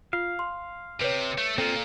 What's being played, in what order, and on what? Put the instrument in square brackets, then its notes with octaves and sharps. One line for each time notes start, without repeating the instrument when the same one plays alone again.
[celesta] F4 [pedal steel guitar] F5
[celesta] C6
[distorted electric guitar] C3 [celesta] B4 C#5
[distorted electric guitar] A3
[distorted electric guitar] A#2 [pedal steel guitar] C4 F4 [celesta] A4